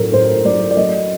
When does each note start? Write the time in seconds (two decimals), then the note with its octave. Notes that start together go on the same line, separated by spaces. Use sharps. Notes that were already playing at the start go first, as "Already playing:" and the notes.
Already playing: A2 F#3 A#4
0.12 A2 C5
0.45 F#3 D5
0.71 D5
0.76 F#3 D#5